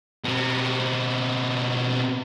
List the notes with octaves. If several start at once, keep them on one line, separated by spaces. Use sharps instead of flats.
B2 C4